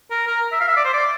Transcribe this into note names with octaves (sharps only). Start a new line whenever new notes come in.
A#4
A#4
E5
F5
E5
D5
C5
D5